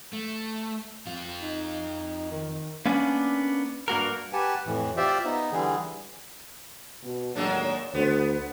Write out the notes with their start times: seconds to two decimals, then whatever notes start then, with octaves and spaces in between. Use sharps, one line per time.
0.13 A3
1.07 F2 F4
1.43 D#4
2.31 D#3
2.86 A#3 B3 C#4 D4
3.88 G2 A#3 F#4 A#4
4.33 G4 B4 F#5 G#5 A5
4.66 F2 A2 E3
4.97 F4 G4 C5 D5 E5
5.25 B3 D#4
5.52 D3 E3 G3 G#4
7.04 B2
7.35 D#2 A2 F#3 G#3 A#3 D4
7.94 D2 B3 A4 C5